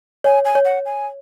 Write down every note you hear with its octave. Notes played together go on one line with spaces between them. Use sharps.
C#5 G#5
G#5
C#5
F#5
G#5